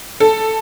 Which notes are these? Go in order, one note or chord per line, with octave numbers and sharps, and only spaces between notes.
A4